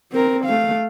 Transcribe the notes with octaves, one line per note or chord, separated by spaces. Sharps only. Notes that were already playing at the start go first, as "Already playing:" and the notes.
C4 A#4
A3 F5